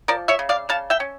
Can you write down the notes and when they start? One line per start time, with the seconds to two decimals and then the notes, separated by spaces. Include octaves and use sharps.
0.08 F3 A#4 D5
0.28 C#5 E5
0.39 C#3
0.49 D5 F5
0.69 C#3 F5 A5
0.90 E5 G5
1.00 C#4